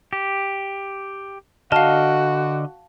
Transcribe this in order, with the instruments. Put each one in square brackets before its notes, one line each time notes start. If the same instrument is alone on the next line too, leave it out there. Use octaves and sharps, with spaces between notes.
[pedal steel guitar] G4
[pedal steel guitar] D3 D#5 F6 [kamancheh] F#4 [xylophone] F5 A5